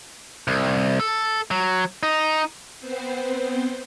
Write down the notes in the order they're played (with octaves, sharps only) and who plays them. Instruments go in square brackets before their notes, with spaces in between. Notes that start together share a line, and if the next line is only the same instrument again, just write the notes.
[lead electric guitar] C2
A4
F#3
D#4
[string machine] B3 C4 C5